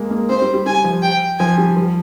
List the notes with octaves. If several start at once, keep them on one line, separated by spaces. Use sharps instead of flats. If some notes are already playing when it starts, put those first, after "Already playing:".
Already playing: G#3 A#3
A#3
C4 C5
G3
G3
G3 G#5
F3
G5
F3 G#5
G3
F3